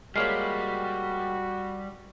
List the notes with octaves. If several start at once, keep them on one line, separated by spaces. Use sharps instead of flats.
G3 G#3 A#3 F#4 C#5 F6 C7